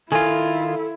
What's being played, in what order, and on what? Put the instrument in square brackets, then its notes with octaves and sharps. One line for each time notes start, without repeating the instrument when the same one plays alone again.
[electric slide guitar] D#3 F4 [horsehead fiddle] E4 [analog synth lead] A4 [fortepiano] G#5